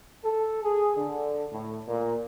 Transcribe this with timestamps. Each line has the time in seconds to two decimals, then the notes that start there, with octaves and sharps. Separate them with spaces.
0.24 A4
0.63 G#4
0.97 D3
1.51 A2
1.88 A#2